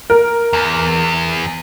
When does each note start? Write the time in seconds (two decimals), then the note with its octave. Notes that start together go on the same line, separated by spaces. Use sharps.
0.10 A#4
0.53 E2